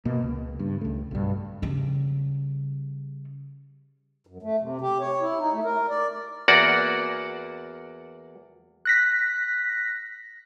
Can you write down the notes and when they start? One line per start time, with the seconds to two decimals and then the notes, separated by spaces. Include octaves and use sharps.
0.05 B2 A#3
0.23 C#2
0.59 G2
0.81 C#2 A3
1.11 B1 G2
1.62 C#3 G3
4.27 F#2
4.43 A3
4.60 C3
4.81 G4
5.00 C#5
5.21 E4
5.39 D#4
5.53 A3
5.64 A#4
5.89 D5
6.48 E2 A#3 F#4 D5 F#5
8.85 F#6 A#6 B6